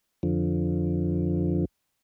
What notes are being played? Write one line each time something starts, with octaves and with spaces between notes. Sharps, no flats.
F2 D3 F3